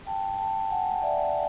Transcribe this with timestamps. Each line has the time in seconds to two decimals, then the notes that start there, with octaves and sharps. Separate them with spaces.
0.07 G5 A5
0.38 G5 A5
0.71 F#5 G#5
1.02 D5 E5